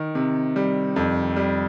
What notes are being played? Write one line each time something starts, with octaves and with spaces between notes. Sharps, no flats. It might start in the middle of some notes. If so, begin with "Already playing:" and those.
Already playing: D#3
C3
G3
F2
G3